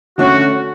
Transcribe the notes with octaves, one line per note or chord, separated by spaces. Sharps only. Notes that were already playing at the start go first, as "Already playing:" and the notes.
D3 A3 C#4 F#4